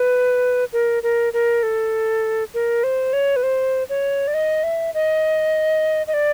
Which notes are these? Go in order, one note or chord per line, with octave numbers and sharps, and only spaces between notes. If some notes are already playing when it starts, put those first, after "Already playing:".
Already playing: B4
A#4
A#4
A#4
A4
A#4
C5
C#5
B4
C5
C#5
D5
D#5
E5
D#5
D#5
D5